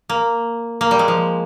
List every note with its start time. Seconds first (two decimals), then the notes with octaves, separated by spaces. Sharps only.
0.09 A#3
0.81 A#3
0.91 G3
0.99 G#3
1.08 F3